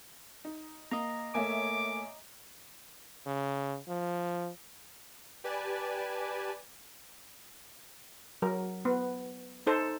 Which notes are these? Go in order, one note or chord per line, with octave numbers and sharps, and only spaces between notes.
D#4
A#3 D#5 A#5
A3 A#3 C#5 E5 G#5 D6
C#3
F3
G4 B4 D5 G#5 A5
F#3 A#4
B3
D#4 A4 C5